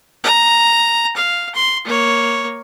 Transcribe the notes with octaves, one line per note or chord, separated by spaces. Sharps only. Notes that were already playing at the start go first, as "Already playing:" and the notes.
A#5
F5
C6
A#3 C#5